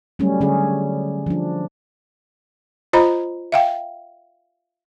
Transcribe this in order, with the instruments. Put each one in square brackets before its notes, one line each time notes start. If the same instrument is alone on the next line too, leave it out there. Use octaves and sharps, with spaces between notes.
[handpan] F#3 G3 A3 C#4
D3 C#4 G#4
F3 D4
[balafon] F4 C5 D#5 A#5 B5
E5 F5 G5